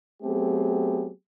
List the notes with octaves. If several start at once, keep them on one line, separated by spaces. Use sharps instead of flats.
F#3 A3 B3 C4 G4 G#4